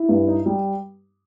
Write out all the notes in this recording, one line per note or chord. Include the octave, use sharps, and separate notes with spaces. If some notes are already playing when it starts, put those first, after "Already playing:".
Already playing: E4
G2
D#4
G3